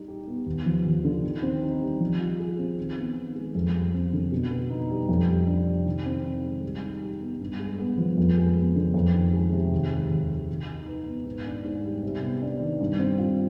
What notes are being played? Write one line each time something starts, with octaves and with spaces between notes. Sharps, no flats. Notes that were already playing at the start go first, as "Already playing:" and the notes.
Already playing: G3 D#4
G4
B3
D#2
F3
D#2
D3
D#3
C4
D#4
G3
F3
F4
G#4
C4
D#3
B3
D#3
G#3
F2
G3
C4
D3
B2
B3
D#4
G3
F2
G3
D4
C3
D#3
C4
D#3
G#3
G3
D#4
G4
B3
G2
G#3
B3
F3
F2
G#3
B3
D3
F2
D#3
G#3
C3
D#2
G#3
D#2
D#3
D#3
D#4
B4
B3
G#2
D4
G#2
G3
C3
B3
D4
D#3
G2
C4
F4